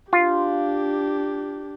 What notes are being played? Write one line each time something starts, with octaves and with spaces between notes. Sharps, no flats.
D4 F4 G4